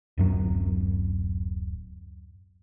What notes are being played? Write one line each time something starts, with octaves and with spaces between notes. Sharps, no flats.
D1 F#2 F#3